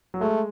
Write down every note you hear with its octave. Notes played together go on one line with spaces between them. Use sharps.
F#3
G#3 A3